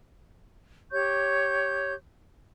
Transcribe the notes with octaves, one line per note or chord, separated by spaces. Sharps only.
G4 C#5 C#6 G6